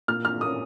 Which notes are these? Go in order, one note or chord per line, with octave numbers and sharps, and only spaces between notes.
A#2 F6
F6
A#3 C#4 D#6